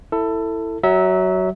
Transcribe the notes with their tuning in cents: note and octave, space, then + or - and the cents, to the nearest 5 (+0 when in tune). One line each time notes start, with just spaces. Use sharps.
E4 +0 A4 +20
F#3 +15 E5 -25